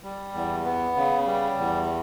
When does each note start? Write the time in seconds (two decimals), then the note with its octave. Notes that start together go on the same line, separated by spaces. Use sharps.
0.03 G3
0.34 E2
0.65 B3
0.96 C#3
1.27 G3
1.58 E2